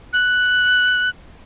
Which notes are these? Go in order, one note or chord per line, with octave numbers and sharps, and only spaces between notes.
F#6